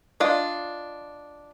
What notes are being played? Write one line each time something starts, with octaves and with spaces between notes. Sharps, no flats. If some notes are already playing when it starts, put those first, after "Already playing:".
D4 F4 D#5